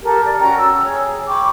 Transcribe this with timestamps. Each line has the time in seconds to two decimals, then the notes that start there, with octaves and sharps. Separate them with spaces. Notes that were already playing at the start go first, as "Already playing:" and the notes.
0.03 G4 A4 A#4
0.26 D5
0.41 C#4 F#4 G5 A#5
0.59 E6
0.83 G#4 C#5
1.29 G5 B5 C#6 D6